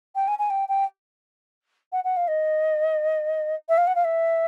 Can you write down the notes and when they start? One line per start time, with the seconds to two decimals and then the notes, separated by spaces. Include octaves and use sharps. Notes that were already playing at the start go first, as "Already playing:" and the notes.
0.15 G5
0.28 G#5
0.38 G#5
0.50 G5
0.68 G5
1.92 F#5
2.04 F#5
2.16 F5
2.27 D#5
3.69 E5
3.77 F5
3.87 F#5
3.95 F5
4.04 E5